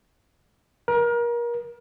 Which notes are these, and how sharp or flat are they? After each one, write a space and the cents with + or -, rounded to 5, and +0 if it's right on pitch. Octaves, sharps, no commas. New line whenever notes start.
A#4 +30